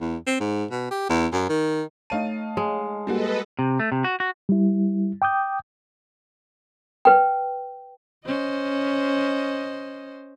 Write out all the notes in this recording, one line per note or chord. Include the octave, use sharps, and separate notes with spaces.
E2
C4
G#2
B2
G4
E2
F#2
D#3
A3 D#4 C#5 F5 A5 D#7
G#3
G3 A#3 F#4 A4 B4 D#5
C3
A3
C3
F#4
F#4
G3 E4
G5 D6 D#6 G6
B4 G5
C#4 C5 D#5